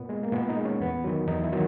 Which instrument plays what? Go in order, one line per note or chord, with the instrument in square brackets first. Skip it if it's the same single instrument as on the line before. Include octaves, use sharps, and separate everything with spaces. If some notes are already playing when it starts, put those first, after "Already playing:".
Already playing: [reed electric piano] A#2 B3
G#3
A#3
A#2 B3
D#4
G#3
C#4
E2 B3
D#3 F#3
E2 D#4
E4
D#3 F#3